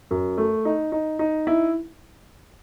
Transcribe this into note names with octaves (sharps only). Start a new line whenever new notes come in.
F#2
A3
D#4
D#4
D#4
E4